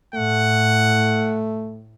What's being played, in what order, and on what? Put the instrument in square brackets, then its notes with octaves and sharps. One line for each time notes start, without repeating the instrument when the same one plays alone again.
[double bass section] A2 [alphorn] A3 [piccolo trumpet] F#5